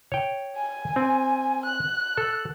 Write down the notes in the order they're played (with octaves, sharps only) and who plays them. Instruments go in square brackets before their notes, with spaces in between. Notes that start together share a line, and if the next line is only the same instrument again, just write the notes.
[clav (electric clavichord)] C#5 G5
[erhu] G#5
[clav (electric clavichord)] C4
[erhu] F#6
[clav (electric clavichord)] A4